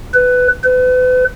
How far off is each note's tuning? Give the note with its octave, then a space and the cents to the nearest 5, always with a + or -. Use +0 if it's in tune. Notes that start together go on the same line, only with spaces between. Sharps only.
B4 +15
B4 +40